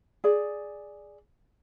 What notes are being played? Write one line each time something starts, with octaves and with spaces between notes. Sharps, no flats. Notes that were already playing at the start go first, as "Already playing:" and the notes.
G#4 D5